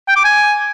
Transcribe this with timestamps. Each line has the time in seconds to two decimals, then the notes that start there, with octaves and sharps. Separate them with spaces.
0.08 G5
0.16 D6
0.24 G#5